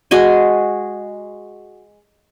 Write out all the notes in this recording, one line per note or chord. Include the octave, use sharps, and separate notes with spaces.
G#3 F#4 D#5 G#5